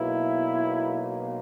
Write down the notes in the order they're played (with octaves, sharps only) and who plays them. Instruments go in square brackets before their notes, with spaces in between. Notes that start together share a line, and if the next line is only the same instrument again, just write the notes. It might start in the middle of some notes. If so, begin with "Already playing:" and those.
Already playing: [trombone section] B1 B2 A#3 E4